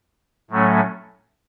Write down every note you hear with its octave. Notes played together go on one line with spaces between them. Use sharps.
A2 F#3 A3 C#4